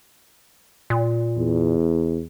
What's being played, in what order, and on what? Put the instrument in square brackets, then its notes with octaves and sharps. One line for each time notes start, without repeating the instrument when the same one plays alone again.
[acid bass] A#2
[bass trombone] E2